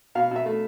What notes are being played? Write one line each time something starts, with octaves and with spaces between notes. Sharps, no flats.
B2 F5
B2 E5
A3